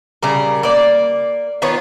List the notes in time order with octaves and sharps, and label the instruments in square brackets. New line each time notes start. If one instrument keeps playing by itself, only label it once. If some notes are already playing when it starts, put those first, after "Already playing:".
[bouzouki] C#3 G3 A#4
A#3 D5
D#3 B3 F4 C#5